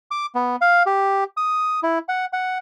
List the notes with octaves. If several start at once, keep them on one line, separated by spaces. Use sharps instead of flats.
D6
B3
F5
G4
D#6
E4
F#5
F#5